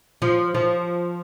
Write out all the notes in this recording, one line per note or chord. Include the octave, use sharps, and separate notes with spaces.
F3
F3